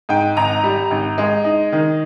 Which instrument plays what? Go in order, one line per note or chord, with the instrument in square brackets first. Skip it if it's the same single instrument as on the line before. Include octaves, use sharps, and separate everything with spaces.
[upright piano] G#2 G5
G#1 A#5
G3
G#1
G#3
D#4
D#3